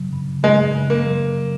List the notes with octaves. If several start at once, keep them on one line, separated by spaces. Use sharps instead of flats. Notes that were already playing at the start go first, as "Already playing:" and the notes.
Already playing: C#3 F#3
C#3
C#3 G#3
C#3
A#3
F#3